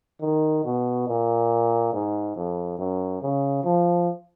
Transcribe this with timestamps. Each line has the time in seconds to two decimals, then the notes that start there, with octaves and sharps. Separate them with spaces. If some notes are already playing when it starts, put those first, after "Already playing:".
0.21 D#3
0.64 B2
1.08 A#2
1.93 G#2
2.36 F2
2.78 F#2
3.22 C#3
3.64 F3